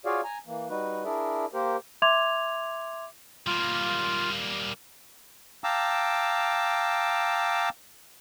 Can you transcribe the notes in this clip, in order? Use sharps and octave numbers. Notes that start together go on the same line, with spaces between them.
F4 F#4 G#4 C#5 D5 F5
G#5 A#5
E3 A#3
G3 D#4 F#4 B4
D4 E4 G#4 A#4 D5 E5
A#3 G4 A#4 C5
E5 C6 D6 G#6 F7
G3 A#3 F4
F5 G5 A5 A#5 D6 E6